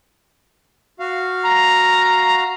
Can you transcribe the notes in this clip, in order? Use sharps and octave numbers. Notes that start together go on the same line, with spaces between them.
F#4 F5
A#5